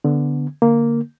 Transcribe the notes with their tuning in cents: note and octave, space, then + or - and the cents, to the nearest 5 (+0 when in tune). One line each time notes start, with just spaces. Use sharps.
D3 -5 B3 +0
D3 -15 A#3 -5